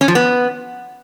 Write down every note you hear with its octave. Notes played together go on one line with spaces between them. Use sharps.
C#4
F3
B3